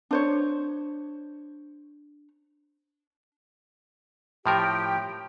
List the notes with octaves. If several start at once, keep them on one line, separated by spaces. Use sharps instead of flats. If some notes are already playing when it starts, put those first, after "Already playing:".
D4 C5 C#5
A2 F3 G4 A#4 G5